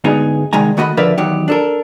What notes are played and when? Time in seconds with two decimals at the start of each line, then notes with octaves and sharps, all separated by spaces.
0.04 D2 G#2 G#3 B3 D#4 G#4
0.53 C2 D#3 G#3 G#5 A#5
0.77 D#3 A3 F#4 D#5 B5
0.97 D3 F3 A#4 B4 D5 E5
1.18 E2 D#3 F#3 G4
1.48 D4 A4 A#4